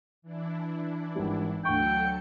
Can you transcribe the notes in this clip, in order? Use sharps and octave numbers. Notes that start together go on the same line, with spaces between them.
E3 D4 E4
G#1 G3
D2 F#3 A4 G5 C#6 C#7